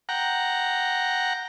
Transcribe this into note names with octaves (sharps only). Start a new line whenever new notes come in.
F#5 G5 A#5